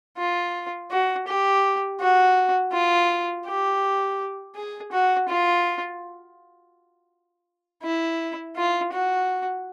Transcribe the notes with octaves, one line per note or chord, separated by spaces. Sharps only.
F4
F#4
G4
F#4
F4
G4
G#4
F#4
F4
E4
F4
F#4